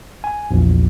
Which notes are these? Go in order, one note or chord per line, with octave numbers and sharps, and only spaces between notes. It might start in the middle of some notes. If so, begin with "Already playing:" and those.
G#5
A#1 E2